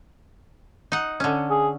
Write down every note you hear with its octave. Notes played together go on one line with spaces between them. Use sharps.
D#4 F#5
D3 C#4
G#4